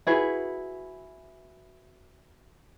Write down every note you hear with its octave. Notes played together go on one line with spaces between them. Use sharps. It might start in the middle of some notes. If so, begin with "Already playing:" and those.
E4 F#4 G#4 B4